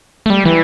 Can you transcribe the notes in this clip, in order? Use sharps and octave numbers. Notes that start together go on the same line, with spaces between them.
A3
G3
E3